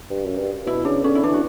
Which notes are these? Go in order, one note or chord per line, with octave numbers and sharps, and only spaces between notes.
G2
F#2
G2
B2 E4
C#3 D4
D3 C#4
E4
E3 D4
F#4